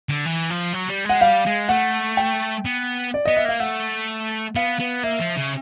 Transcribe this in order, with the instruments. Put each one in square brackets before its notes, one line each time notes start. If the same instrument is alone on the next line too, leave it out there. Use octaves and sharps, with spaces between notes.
[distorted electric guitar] D3
E3
F3
F#3
G3
[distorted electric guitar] G#3 [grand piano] F#5
[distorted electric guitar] G3 [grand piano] F5
[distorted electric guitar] G#3
[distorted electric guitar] A3 [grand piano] F#5
[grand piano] G5
[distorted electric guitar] B3
[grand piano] D5
[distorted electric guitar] B3 [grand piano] D#5
[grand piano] E5
[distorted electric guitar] A#3 [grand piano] F5
[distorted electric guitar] A3 [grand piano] F#5
[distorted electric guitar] B3 [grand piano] F5
[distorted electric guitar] B3
[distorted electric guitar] A#3 [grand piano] E5
[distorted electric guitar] F3
C#3